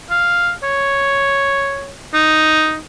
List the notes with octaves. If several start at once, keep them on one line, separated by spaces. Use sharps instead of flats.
F5
C#5
D#4